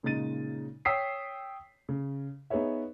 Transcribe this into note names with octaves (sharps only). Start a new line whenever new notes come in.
A#2 C#3 G#3 D#4 A6 D#7
C#5 G5 D#6 E6 B6 C7
C#3
B3 D#4 G#4 B4 C#5 E5